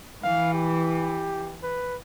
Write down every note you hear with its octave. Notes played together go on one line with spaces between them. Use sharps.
E3 F5
G4
B4